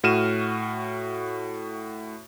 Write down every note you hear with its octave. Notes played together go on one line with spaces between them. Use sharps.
A2 F#4 F6 D#7 E7